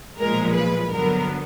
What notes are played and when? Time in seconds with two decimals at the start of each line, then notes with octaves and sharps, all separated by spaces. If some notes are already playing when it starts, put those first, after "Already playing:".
0.20 B1 A#2 F3 G#3 A#4
0.56 B4
0.91 G2 D3 F#3 B3 A#4